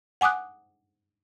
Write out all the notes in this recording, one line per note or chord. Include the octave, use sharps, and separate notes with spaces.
F#5 G#5 D6 D#6 F#6